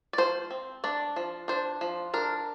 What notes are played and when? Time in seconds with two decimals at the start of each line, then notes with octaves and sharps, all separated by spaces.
0.13 D5
0.18 F3 C5
0.51 C4
0.84 D4 D5
1.16 F3
1.48 D4 C5
1.81 F3
2.14 D4 A#4